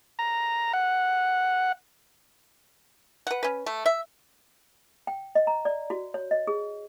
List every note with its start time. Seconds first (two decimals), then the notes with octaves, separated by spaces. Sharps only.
0.19 A#5
0.73 F#5
3.27 B4 F#5
3.43 C#4 B4
3.66 A3
3.86 E5
5.07 G5
5.35 D#5
5.47 A#5
5.65 D5
5.90 F#4
6.14 C#5
6.31 D#5
6.47 G#4